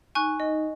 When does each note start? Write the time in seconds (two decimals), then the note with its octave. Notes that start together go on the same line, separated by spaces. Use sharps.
0.15 D#4 G#5 C#6 F#6
0.40 D#4 D#5